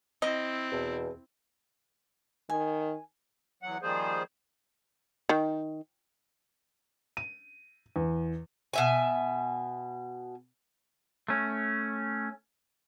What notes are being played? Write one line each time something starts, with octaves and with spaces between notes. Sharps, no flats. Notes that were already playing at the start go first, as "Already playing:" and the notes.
C4 E4 D#5
E2 B2
D#3 G#5
E2 F#3 F#5
D#3 F3 G3 A#3 G#4 C5
D#3
D#7
E2
B2 E5 G#5
A3 C#4